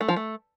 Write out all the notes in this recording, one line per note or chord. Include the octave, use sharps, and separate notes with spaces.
A3
F3
A3